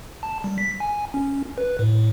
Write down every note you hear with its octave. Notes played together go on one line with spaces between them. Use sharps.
A5
G3
B6
G#5
C#4
B4
A2